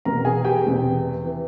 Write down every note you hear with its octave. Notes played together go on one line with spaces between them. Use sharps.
E1 E2 C3 A#4 A#5
G#4 G#5
G4 G5
E1 E2 C3
E3